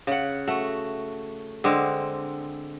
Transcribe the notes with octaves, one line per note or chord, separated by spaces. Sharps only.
C#3 F#5
A3 F#4
D3 G#3 C4